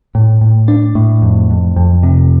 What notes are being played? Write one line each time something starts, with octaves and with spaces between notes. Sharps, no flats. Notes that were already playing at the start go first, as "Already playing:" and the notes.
A2
A2
D4
A2
F2
F2
F2
C3